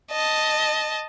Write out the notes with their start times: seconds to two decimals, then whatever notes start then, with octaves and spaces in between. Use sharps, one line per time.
0.11 D#5 A5